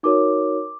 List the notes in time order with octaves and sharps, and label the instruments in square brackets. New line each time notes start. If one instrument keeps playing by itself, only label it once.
[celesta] D#4 F#4 A#4 C#5 D6